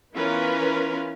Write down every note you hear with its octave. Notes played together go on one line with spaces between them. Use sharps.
E3 B3 C#4 F4 A#4 B4